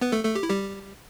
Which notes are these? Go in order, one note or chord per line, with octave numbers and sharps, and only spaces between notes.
B3 B4
A3 A4
A3 A4
G4
E4
G3 G4